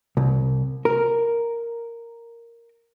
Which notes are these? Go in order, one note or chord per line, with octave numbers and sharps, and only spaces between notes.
C2
A#4